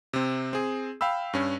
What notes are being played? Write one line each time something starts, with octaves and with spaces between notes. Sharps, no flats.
C3 C4
C4 G#4
F5 G5 B5 E6
G2 C#4